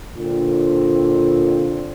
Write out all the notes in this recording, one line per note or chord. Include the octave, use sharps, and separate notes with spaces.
A#2 D3 C4